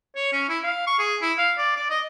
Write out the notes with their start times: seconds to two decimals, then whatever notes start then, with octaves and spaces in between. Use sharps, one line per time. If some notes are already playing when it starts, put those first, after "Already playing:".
0.16 C#5
0.33 C#4
0.49 E4
0.64 F5
0.87 C#6
0.99 G#4
1.22 E4
1.38 F5
1.58 D5
1.77 D5
1.90 D#5